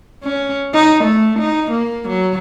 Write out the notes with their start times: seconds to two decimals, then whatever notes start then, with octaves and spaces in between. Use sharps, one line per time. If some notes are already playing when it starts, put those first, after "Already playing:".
0.24 C#4
0.74 D#4
1.05 A3
1.40 D#4
1.72 A#3
2.09 F#3